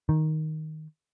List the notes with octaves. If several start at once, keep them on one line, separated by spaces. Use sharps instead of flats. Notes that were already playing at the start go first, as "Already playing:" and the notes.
D#3